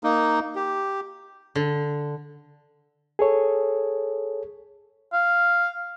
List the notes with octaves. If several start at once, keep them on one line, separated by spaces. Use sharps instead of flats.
A#3 D#4
G4
D3
G#4 A4 C#5
F5